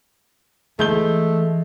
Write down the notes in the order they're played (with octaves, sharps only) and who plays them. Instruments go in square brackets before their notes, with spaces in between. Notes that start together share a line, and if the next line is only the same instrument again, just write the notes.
[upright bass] E3 [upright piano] G#3 G6 G7 [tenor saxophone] A3